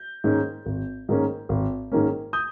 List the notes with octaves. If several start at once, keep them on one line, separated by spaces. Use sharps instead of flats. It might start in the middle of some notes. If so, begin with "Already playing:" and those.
Already playing: G6
G#2 D#3 A#3 C#4
G#1
G#2 D#3 A#3 C#4
G#1
G#2 D#3 A#3 C#4
D#6 G6